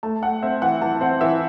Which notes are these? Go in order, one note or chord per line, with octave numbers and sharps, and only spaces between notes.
A3 A5
A3 F#5
C4 E5
E3 F#5
E3 A5
C4 F#5
E3 E5